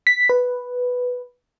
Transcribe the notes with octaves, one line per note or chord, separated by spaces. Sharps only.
B6
B4